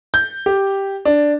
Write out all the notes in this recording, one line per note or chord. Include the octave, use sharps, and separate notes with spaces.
G6
G4
D4